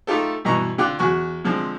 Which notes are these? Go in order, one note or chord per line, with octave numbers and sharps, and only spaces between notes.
A3 D#4 F4 G4 A4
G2 B2 E3 D#5 A#5 C#6
D3 F4 G5 D6 F#6
E2 F#4 G#5 C#6
D3 F3 G#3 C4